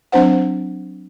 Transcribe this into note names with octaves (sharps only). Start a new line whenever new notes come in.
F#3 C4 D4 C5 F#5